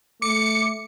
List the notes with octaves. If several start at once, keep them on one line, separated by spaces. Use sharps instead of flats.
A3 D6 C#7